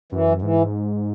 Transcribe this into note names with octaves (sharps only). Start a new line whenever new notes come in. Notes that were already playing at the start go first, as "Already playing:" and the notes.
F#2 E3
G#2 E3